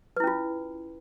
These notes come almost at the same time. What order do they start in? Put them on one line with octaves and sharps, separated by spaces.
B4 E4 C#4 F4